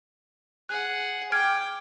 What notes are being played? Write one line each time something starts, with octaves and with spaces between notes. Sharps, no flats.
G#4 F#5 F#6
G5 D6 F6 G#6 D7